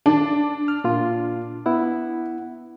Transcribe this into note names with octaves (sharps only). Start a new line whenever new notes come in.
D4 A5
F6
A#2 F4
B3 E4 F#5